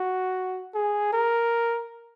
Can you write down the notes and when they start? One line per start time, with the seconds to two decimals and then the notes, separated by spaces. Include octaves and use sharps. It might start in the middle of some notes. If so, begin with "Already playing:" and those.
Already playing: F#4
0.74 G#4
1.13 A#4